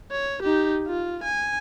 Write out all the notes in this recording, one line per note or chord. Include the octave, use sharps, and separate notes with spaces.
C#5
D#4 G4
F4
G#5